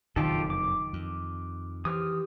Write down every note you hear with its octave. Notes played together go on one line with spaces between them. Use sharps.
F#1 F2 B2 D#3 D#4 F4 G4 A4
D6
F2
E3 G4 C5 D#6 F6